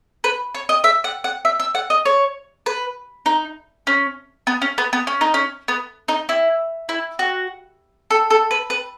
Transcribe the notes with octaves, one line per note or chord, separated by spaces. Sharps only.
B4
C#5
D#5
E5
F#5
F#5
E5
E5
F#5
D#5
C#5
B4
D#4
C#4
B3
C#4
B3
B3
C#4
D#4
C#4
B3
D#4
E4
E4
F#4
A4
A4
B4
B4